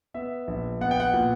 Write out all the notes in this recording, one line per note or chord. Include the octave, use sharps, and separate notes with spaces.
B3 E5
A#1
B3 F#5
G5
F#5
A#2